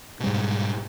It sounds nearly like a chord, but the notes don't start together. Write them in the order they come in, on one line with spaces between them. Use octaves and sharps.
B2 G3 G#2